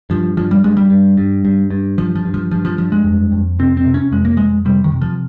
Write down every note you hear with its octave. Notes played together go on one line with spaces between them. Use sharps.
G2 F3
G2 F3
G3
G2 G#3
G3
G2
G2
G2
G2
G2 F3
F3
G2
F3
G2 F3
F3
G2 F3
G#3
F2
F2
C3 C4
C4
C3
C#4
F2 G#3
A#3
F2 G#3
C3 G3
D#3
C3
F3